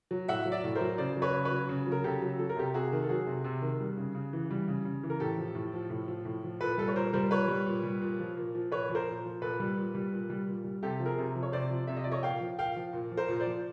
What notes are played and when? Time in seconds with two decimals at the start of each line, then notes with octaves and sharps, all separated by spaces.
0.11 F#3
0.28 A2 E5 F#5
0.45 F#3
0.52 D5 E5
0.64 A2
0.75 A#4 C5
0.81 F#3
0.98 C#3 C5 D5
1.17 F#3
1.22 B4 C#5
1.34 C#3
1.45 B4 C#5
1.51 F#3
1.69 C#3
1.87 F#3 A#4
2.04 C#3 G4 A4
2.22 F#3
2.39 F#3 A4
2.49 A#4
2.56 C3 G4 A4
2.74 C3 F#4 G#4
2.92 D#3
3.03 A4
3.09 F#3 F#4 G#4
3.27 C3
3.44 C3
3.62 D#3
3.80 G3
3.97 C#3
4.15 C#3
4.33 E3
4.51 G3
4.68 C#3
4.85 C#3
5.03 E3
5.10 A#4
5.20 A2 G4 A4
5.38 F3
5.55 A2
5.73 F3
5.90 A2
6.08 F3
6.25 A2
6.44 F3
6.60 A#2 A4 B4
6.78 G3 A4 B4
6.88 C#5
6.96 A#2 A#4 C5
7.13 G3 A#4 C5
7.31 A#2 B4 C#5
7.48 G3
7.66 A#2
7.83 G3
8.01 A#2
8.20 F3
8.37 A#2
8.55 F3
8.72 A#2 B4 C#5
8.89 F3
8.95 A#4 C5
9.07 A#2
9.25 F3
9.41 A#2 A4 B4
9.60 G3
9.77 A#2
9.95 G3
10.12 A#2
10.30 G3
10.47 A#2
10.64 G3
10.83 C3 G4 A4
11.00 F3
11.06 G#4 A#4
11.18 C3
11.35 F3
11.43 C#5
11.52 C3 C5 D5
11.70 F3
11.87 C3 E5
11.97 D#5
12.04 F3 D5
12.12 C#5 D#5
12.23 A#2 F5 G5
12.40 F3
12.59 A#2 F5 G5
12.76 F3
12.93 A#2
13.11 F3
13.17 A#4 C5
13.28 A#2
13.40 C5 D5
13.46 F3